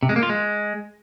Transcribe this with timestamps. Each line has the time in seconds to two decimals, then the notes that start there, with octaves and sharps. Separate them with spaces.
0.03 C3
0.09 G#3
0.16 A#3
0.23 F4
0.29 G#3